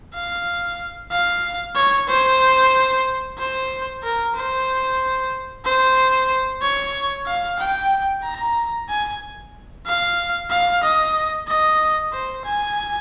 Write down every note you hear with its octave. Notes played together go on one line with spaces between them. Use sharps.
F5
F5
C#5
C5
C5
A#4
C5
C5
C#5
F5
G5
A#5
G#5
F5
F5
D#5
D#5
C5
G#5